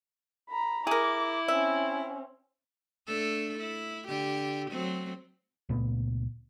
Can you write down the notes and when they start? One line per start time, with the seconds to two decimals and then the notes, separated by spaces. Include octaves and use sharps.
0.49 A#5 B5
0.87 E4 G#4 A#4 D6
1.48 C4 C#4 E5
3.07 A3 D4 A4
3.59 E4
4.07 D3 G4
4.71 F#3 A3 C4
5.69 C#2 A#2 A3 B3